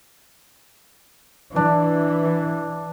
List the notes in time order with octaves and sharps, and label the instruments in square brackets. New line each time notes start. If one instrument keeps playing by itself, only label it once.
[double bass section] E3 [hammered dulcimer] D4